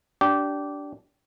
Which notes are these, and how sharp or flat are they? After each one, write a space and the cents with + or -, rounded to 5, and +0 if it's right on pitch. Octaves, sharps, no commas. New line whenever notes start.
D4 -15 G4 -20